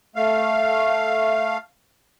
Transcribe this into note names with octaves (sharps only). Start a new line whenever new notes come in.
A3 F5